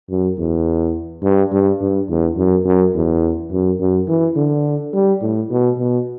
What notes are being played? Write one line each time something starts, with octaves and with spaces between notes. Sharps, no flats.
F#2
E2
G2
G2
G2
E2
F#2
F#2
E2
F#2
F#2
E3
D3
G3
A2
B2
B2